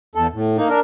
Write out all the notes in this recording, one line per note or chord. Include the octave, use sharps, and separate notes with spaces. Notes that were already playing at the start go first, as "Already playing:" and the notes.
E2 A4
A2
A#3 D#4
D4 A#4